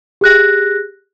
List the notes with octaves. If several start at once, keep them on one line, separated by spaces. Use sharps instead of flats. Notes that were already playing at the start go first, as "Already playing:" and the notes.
G4 G#4 F#6 A#6